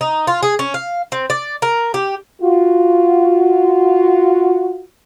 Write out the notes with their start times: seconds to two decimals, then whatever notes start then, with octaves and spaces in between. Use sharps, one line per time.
0.01 D#4
0.27 F4
0.43 G#4
0.59 C#4
0.74 F5
1.12 C4
1.30 D5
1.62 A#4
1.94 G4
2.42 F4 F#4